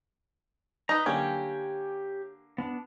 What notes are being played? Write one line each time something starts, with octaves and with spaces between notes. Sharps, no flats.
D#4 B4 D#5 A#5
D3 A#3 C#4 D4 G4 G5 G#5
B3 D4